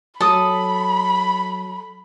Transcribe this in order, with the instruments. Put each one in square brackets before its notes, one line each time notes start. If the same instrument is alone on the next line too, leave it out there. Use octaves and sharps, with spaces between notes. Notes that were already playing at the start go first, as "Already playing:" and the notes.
[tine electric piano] F#3 [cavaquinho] A4 D#6 [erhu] B5